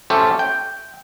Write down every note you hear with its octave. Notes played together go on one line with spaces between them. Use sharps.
A3 C#4 G4 A4 C5
G5